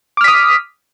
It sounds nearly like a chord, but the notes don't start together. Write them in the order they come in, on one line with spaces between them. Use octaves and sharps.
D6 F6 B6 D#6